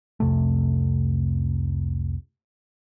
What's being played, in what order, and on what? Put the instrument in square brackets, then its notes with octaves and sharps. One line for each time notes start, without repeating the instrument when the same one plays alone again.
[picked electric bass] C2 F2 C3 A3